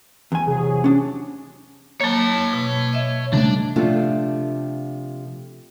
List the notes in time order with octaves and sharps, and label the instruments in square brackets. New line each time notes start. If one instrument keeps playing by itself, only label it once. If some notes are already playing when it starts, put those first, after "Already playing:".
[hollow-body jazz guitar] E2 G#5
[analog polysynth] C3 F#3 G#4
[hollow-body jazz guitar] C#4 D4
[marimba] F#3 A#3 [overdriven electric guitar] C#5 A5
[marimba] B2
D#5 E5
[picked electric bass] C#3 G3 A3 [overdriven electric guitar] D4
[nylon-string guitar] C3 F3 A3 D4 F4